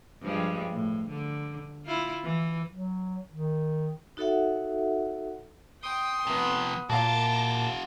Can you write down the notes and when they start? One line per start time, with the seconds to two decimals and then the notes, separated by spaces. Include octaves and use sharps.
0.22 G2 F3 G#3
0.71 A2
1.09 D3
1.85 E4 F4
2.23 E3
2.70 F#3
3.32 D#3
4.17 D#4 F#4 A4 C#5 E5 F#5
5.83 G5 C6 D#6
6.27 C3 F3 B3
6.90 A#2 F#4 F5 A5 A#5 D6